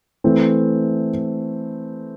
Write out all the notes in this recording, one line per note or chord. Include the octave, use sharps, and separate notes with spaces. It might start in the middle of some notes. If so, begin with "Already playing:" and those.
E3 A3 C4